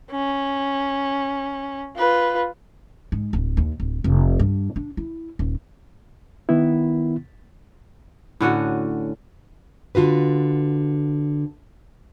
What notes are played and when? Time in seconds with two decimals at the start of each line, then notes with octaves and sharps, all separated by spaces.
0.11 C#4
1.96 F4 B4
3.12 G#2
3.33 D1
3.57 D#2
3.80 D1
4.04 F1
4.39 G2
4.76 D4
4.97 E4
5.39 D#1
6.49 D#3 B3 E4
8.41 A2 D3 C#4 F#4
9.95 D3 F4 F#4 B4